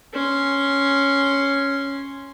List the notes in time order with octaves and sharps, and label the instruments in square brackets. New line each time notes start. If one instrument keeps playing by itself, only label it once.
[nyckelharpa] C#4 C6